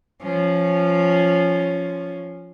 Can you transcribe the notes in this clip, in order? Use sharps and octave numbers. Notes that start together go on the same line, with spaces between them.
F3 C#4